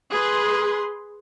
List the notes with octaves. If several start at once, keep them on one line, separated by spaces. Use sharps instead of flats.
G#4 B4 C6